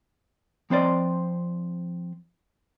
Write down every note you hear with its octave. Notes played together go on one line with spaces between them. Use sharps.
F3 C4 C5 D5 D#5